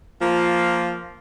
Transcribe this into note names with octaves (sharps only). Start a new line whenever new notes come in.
F3 A#3 F4